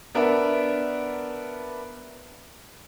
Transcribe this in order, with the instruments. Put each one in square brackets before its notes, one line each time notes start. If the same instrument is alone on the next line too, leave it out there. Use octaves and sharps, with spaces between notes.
[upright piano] B3 D4 A#4 E5